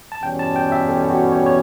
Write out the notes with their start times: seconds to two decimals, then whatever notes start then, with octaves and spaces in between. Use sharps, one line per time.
0.12 A5
0.22 E2 B2 G3 C#4 G5
0.39 A5
0.56 G5
0.72 E5
0.89 A4
1.10 F#4
1.32 C#5
1.46 C#5